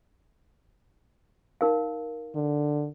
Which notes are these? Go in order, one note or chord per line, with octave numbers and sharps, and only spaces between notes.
D#4 A#4 F5
D3